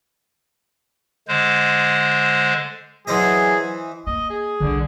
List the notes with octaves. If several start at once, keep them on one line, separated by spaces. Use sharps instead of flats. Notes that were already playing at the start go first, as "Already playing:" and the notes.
D3 G#3 C5
E3 F#3 G#4 C5 D#5
A#3 D#5
G#4
B1 D3 G3